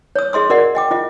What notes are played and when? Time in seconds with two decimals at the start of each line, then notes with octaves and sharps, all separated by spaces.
0.16 C#5 D#6
0.33 G#4 D#5 C6 D#6
0.50 F#4 A#4 D5 D#5 F#5
0.75 D#5 G5 D6
0.91 F4 D#5